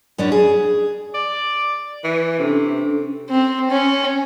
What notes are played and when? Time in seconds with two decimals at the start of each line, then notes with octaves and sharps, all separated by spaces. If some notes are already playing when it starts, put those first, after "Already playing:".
0.18 F#2 C#4 D4 E4
0.32 G#4
1.14 D5
2.04 E3
2.39 C3 C#4 D4 A4
3.30 C4
3.70 C#4